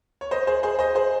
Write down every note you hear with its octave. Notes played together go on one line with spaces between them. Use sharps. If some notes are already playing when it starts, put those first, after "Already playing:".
C#5
C5 D#5
G#4 C5
G#4 C5
C5 D#5
G#4 C5